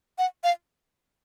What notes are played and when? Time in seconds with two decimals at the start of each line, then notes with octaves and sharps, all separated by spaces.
0.18 F#5
0.44 F5